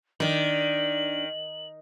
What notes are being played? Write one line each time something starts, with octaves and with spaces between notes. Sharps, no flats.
D#3 D4 D5 F#7